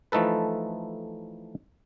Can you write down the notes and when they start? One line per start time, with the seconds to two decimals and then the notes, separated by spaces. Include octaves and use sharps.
0.12 E3 F3 A3 D#4 A4 B4